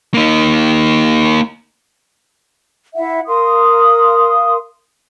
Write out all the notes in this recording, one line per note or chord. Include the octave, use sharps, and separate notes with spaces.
A#3 D#4
E4 E5 F#5
A#4 F5 C6 D#6